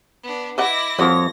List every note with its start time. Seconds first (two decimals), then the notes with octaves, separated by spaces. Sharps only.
0.23 B3 D4
0.58 E4 B4 D#5 F#5 D6 A#6
0.99 F2 F3 G3 A#3 F#4 C#5 A#6